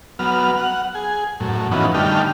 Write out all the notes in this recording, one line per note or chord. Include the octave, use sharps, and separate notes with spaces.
F#3 B3 F6
F#5
G#4
F#2 A2
E3 F3 B3 C#4 D#4 F#4
D3 G3 A3 D#4 G4 F6